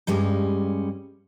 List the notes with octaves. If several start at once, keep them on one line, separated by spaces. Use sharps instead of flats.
G2 G3 G#3 C#4